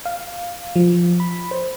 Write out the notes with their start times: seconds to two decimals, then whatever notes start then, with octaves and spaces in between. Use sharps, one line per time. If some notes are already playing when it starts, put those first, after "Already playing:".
0.05 F5
0.76 F3
1.20 B5
1.51 C5